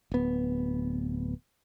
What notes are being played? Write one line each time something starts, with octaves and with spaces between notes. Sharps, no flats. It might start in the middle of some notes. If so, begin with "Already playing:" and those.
D1 B3